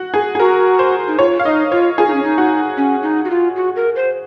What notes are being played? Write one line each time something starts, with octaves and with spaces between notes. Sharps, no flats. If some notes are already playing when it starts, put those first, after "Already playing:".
Already playing: F#4
G#4
G#4
F#4 A#4
C5
D#4
F4 C#5
F5
D#4 D#5
F4 C#5
F4 G#4
D#4
C#4
D#4
F#4
C#4
D#4
F#4
F4
F#4
A#4
C5